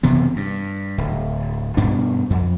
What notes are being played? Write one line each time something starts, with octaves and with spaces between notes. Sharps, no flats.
F#1 C3 E3 B3
G2
D1
G2 B2 D4
F2